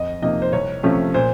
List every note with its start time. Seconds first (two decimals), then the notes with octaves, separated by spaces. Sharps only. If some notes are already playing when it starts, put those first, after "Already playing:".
Already playing: F2 D#5
0.22 C3 F3 A#3 D#4 D#5
0.42 C5
0.53 C2 C#5
0.83 C3 F3 A3 C#4
1.14 A#2 C5